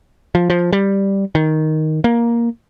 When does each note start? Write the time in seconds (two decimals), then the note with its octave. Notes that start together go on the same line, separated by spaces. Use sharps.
0.35 F3
0.50 F3
0.73 G3
1.35 D#3
2.04 A#3